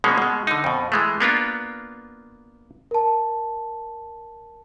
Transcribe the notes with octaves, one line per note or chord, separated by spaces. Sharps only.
B2 F3 G#3 A#3 C#4
B2 G#3
D3 D#4
F2 B2
E3 G#3 A3
A#3 B3 D4 F4
A#4 A5